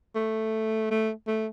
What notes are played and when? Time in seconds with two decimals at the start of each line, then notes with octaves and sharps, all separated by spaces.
0.15 A3
0.90 A3
1.27 A3